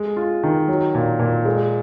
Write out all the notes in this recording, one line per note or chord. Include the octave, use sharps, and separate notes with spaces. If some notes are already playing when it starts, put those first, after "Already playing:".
Already playing: G#3
F4
D#3
F#3
A#2
A#2
G#3